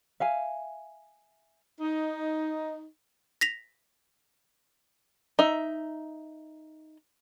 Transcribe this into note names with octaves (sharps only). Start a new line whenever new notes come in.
E5 F5 G#5
D#4
A#6 B6 F7
D#4 E5